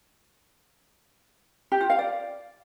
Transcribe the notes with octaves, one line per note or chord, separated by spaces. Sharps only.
G4
F4
F5
D5